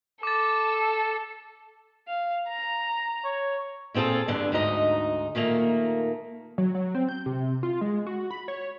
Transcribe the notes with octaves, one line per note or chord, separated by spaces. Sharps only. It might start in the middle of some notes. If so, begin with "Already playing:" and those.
A4 D6 A6
F5
A#5
C#5
A#2 C4 F4 G#4 A4
E2 G2 D3
D2 G#2 D#4 D#5
A#2 D#3 A3 A#3
F#3
F#3
C4
G6
C3
F4
G#3
F#4
B5
C#5